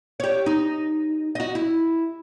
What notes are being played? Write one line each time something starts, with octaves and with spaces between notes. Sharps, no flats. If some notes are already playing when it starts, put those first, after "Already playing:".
G4 C#5
D#4
F#4 D#5
E4